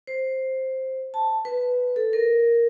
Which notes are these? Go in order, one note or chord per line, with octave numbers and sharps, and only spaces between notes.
C5
A5
B4
A4
A#4